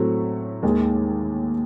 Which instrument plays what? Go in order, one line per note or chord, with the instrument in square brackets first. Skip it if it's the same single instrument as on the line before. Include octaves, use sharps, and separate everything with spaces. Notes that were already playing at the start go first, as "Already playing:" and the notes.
Already playing: [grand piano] A2 F#3 A3 C4
D#2 D#3 G#3